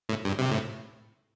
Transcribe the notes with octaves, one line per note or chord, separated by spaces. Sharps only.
A2
G2
C3
A2